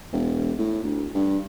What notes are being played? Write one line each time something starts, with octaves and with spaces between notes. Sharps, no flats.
E1
A2
D2
G2